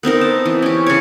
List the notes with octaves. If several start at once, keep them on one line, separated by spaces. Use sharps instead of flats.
B3 C4 D#4 A#4
A5
E3
C#4 G4
C#3 C#5